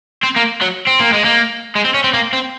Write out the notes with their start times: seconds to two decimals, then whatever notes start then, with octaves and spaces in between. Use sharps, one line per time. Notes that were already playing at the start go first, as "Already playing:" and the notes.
0.23 C4
0.36 A#3
0.61 F#3
0.87 C4
1.00 A#3
1.13 G#3
1.24 A#3
1.75 G#3
1.85 C4
1.94 C#4
2.04 C4
2.14 A#3
2.33 C4